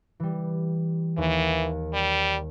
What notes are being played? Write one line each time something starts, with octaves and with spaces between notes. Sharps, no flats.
E3 G3
D#2 E3
G3